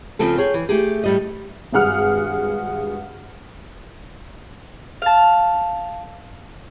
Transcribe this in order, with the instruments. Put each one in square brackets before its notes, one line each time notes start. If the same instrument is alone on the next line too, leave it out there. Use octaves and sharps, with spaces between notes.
[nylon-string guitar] C#3 F3 C4 A4
G#4 C#5 G5
E3
A3 G4 G#4
A2 G3 D#5
[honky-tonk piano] G#1 G2 G#4 F#5 F6
[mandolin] F5 A5